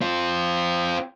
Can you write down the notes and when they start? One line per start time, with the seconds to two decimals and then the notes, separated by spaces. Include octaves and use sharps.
0.01 C4 F4